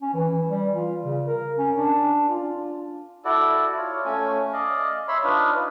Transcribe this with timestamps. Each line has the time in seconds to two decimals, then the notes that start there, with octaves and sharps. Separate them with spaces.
0.02 C#4
0.14 E3
0.49 G3
0.73 F4
1.02 C#3
1.26 A#4
1.58 C#4
1.76 D4
2.29 F4
3.25 E4 F#4 A4 D5
3.77 F4 C#5
4.05 A3 C#4 G#5
4.53 D5 D#5 F5
5.08 C#5 E5 B5 C6
5.24 D4 D#4 F4 B4